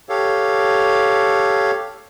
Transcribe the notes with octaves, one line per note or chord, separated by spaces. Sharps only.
G4 A4 C#5 F5